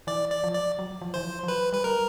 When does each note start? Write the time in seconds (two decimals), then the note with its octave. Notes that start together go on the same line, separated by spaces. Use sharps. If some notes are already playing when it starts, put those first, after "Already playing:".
0.07 E3 D5
0.31 D5
0.44 F3
0.54 D5
0.79 F#3
1.01 F3
1.14 E3 C5
1.25 F3
1.43 F3
1.48 F#3 B4
1.72 G3 B4
1.84 G3 A#4